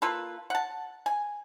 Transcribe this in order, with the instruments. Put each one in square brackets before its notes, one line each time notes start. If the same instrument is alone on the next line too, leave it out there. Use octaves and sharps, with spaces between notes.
[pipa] A#3 F4 A4 B4
F#5 A5
G#5